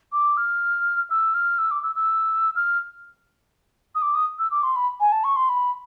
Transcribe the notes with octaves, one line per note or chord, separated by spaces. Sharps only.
D6
F6
E6
F6
E6
D6
E6
E6
F6
D#6
D6
D#6
E6
D6
C6
B5
G#5
A5
C#6
C6
B5